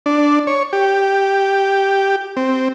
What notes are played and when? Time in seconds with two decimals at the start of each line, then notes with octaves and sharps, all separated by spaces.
0.06 D4
0.47 C#5
0.73 G4
2.37 C4